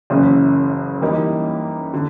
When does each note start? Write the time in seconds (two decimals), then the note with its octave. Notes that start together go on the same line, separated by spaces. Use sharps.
0.10 F#1 F#2 C#3 E3
1.01 E3 G3 A#3 D#4 G4
1.94 D3